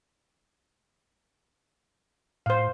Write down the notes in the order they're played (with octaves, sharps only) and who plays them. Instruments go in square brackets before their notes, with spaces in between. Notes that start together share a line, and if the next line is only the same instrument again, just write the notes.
[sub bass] A2 [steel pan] C5 F5